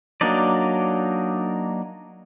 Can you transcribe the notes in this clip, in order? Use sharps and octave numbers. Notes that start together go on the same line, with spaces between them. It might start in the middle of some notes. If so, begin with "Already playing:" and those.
F#3 A#3 D4 D#4 D5